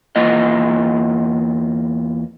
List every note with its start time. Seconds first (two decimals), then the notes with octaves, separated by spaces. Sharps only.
0.16 E2 A#3 F4 D#5